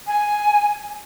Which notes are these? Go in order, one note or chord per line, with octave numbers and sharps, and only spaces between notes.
G#5